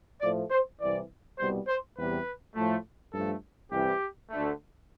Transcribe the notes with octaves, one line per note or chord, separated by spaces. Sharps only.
A2 F3 A3 D5
C5
C2 C3 E3 D5
C2 B2 G3 C5
C5
E2 C3 G3 B4
A2 F3 A3
G2 F3 A3 A4
C2 C3 E3 G3 G4
D2 D3 A3